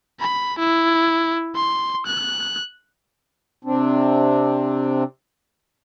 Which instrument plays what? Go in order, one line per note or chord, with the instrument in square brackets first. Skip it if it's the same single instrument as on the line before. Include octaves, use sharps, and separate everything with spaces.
[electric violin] B5
E4
C6
F#6
[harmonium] C3 C4 D4